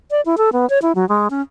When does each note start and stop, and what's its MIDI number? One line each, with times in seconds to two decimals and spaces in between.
0.11 0.21 74
0.26 0.36 64
0.38 0.50 69
0.53 0.68 59
0.70 0.79 73
0.82 0.92 64
0.95 1.07 54
1.09 1.28 56
1.30 1.41 61